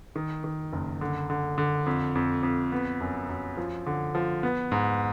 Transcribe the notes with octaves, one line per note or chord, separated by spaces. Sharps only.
D#3
D#3
F#1
D3
D3
D3
F2
F2
F2
B3
F#2
F#2
F3
D3
F3
B3
G#2